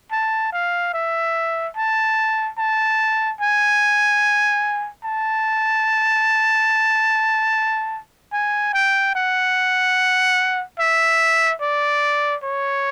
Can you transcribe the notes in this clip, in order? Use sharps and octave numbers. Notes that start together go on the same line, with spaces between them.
A5
F5
E5
A5
A5
G#5
A5
G#5
G5
F#5
E5
D5
C#5